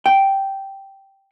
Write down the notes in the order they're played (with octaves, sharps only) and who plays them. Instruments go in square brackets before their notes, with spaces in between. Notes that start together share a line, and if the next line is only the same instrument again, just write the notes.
[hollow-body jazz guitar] G5